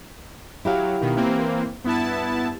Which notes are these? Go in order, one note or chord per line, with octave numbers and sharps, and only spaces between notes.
F#3 E4 G4 F5
B2 D#3
E3 A#3 C4
G2 B3 E4 A5